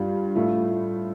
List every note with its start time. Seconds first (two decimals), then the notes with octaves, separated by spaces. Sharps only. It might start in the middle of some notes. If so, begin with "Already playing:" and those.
Already playing: G2 G3 F4
0.35 A2 A3 F4